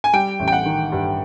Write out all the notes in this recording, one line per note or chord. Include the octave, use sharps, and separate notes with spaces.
G#5
G3 G5
A1
G5
F#5
D#3
G2